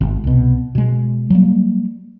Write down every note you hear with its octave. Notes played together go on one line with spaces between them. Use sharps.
G#1
C2 B2
B2 G#3
F#3 G3 A#3